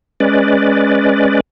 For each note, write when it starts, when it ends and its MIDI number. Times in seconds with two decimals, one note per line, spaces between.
0.20 1.40 56
0.20 1.40 61
0.20 1.40 71
0.20 1.40 74